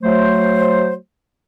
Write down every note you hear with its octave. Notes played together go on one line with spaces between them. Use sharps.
F#3 A3 C5